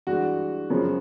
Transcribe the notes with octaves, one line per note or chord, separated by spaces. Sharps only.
G2 E3 G#3 F#4
F#2 C#3 F3 G#3